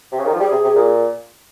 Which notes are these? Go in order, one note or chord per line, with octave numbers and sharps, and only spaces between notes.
C3
C#3
D#3
F3
G3 G#4
C3
C3
A#2